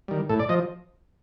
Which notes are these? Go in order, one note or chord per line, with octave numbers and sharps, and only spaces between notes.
D#3 G3
A2 A4
D5
F3 D#5